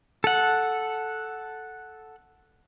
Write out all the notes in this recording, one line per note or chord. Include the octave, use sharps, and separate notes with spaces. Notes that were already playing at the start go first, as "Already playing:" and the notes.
A4 F#5